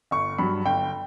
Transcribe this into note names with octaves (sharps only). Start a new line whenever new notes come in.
G1 C#6
G2 F#3 B5
G1 G5